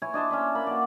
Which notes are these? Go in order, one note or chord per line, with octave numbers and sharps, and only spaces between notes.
E4 C#5 G#5
D4 D#5 A5 C6
C#4 D4 E5 A5
A#3 A5 B5
F#4 D5